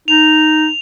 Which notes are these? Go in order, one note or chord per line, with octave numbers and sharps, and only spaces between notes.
D#4 F7